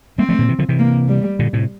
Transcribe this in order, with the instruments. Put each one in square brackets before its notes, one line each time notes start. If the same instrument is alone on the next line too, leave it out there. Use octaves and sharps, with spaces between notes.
[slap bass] G3 A#3 [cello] C4
[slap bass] F3 A3
A#2 D3
C3 E3
D3 F3
C3 E3
[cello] A#3
G3
[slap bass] A#2 D3
A2 C3